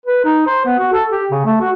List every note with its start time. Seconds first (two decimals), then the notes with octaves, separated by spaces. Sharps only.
0.06 B4
0.24 D#4
0.46 C5
0.65 B3
0.79 F#4
0.92 A4
1.10 G4
1.31 C#3
1.45 A3
1.60 F#4